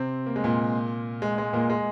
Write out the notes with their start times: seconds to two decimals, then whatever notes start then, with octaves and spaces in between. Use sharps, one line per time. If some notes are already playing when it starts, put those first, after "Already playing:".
Already playing: C3 C4
0.26 A#3
0.36 G#3
0.44 A#2 A#3
1.22 G#3
1.38 G#3
1.53 A#2 A#3
1.70 G#3